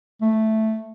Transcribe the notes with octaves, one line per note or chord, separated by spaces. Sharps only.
A3